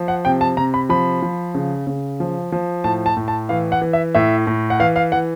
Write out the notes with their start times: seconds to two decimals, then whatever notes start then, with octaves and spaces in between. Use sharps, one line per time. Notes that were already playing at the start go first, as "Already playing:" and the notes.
Already playing: F3
0.08 F#5
0.25 C3 G5
0.41 A5
0.57 C3 A#5
0.74 B5
0.89 F3 B5
1.22 F3
1.55 C#3
1.87 C#3
2.20 F3
2.52 F3
2.84 A2 A5
3.06 A5
3.17 A2
3.28 A5
3.49 E3 F5
3.72 F#5
3.82 E3
3.93 E5
4.15 A2 E5
4.47 A2
4.70 F#5
4.80 E3 F5
4.96 F5
5.12 E3 F#5